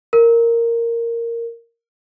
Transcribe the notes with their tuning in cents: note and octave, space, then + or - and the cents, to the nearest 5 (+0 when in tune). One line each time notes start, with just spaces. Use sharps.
A#4 -5